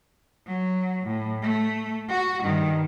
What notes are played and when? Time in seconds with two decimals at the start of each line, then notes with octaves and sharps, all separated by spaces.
0.47 F#3
1.06 A2
1.42 A3
2.09 F#4
2.43 G2 D#3